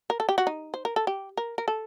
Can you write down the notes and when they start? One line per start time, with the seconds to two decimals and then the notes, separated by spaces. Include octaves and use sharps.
0.10 A#4
0.20 A4
0.29 G4
0.38 F#4
0.47 D#4
0.74 C5
0.85 A#4
0.96 A4
1.07 G4
1.37 A#4
1.58 A#4
1.68 A4